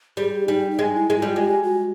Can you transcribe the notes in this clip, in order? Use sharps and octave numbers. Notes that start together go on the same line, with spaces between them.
G3 G#4
G3 D#4
D#4
G#3
E4
G#3
F4
G3
G#3 G4
F#4